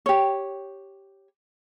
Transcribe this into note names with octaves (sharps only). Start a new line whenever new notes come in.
G4 C#5